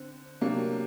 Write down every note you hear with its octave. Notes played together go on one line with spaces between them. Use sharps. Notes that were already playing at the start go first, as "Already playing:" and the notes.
Already playing: D3 C4
C3 F#3 A#3 D4